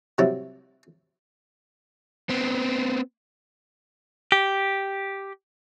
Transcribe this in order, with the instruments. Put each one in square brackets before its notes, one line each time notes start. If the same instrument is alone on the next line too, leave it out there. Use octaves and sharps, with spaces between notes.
[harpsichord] C3 F#3 G3 E4
[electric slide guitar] B3 C4
[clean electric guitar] G4